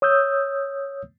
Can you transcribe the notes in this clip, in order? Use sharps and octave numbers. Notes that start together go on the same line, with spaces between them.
C#5 D#6 E6 G6